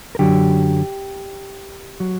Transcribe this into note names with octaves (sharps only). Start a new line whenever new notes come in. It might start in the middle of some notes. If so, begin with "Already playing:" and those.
A#4
F#2 D3 F#3 G4
F#3